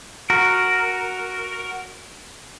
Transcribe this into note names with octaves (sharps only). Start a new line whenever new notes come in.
F#4 A#4